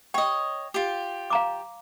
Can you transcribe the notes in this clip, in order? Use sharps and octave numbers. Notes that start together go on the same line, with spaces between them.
C#5 D#5 G5
F4 G4
F5 A#5 D6